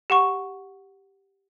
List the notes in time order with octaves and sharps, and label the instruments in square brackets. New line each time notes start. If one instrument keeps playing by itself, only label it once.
[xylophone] G4 F#5 C#6